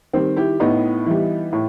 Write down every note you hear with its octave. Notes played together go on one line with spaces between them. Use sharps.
D#3 G3 C4
E4 G4
A2 B3 D#4
E3 G3
A2